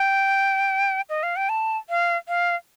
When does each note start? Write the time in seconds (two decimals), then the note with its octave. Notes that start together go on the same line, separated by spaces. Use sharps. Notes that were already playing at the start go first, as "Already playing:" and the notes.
Already playing: G5
1.10 D#5
1.23 F5
1.36 G5
1.49 A5
1.90 F5
2.28 F5